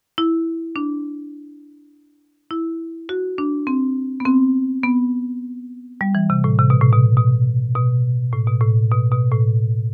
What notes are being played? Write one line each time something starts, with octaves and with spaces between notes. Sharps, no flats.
E4
D4
E4
F#4
D4
C4
B3
C4
B3
G3
E3
C3
A2
C3
B2
A2
B2
B2
B2
A2
B2
A2
B2
B2
A2